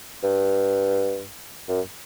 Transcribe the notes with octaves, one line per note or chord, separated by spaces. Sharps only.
G2
F#2